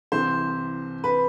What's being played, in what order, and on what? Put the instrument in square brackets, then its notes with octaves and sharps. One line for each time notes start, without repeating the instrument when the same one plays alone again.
[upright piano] C2 C3 E3 C5
B4